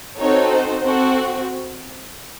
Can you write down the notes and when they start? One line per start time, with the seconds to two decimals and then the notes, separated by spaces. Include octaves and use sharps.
0.19 C4 D#4 F#4 A4 C#5
0.53 C5
0.86 C4 F#4 A4